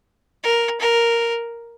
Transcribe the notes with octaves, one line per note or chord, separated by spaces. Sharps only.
A#4
A#4